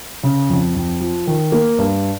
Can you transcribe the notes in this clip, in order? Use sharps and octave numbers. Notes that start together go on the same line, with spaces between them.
C#3
F2
F2
F3
D#3
A#3
G2